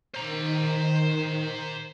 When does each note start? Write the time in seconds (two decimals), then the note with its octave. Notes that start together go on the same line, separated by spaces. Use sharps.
0.15 D#3 C5 A#5